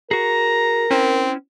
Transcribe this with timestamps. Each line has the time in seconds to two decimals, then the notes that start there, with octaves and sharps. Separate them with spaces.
0.11 F#4 G#4 A#4 A#5
0.91 C4 C#4 E4